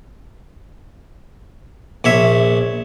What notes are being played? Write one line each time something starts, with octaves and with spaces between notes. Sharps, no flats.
A#1 C#5 E5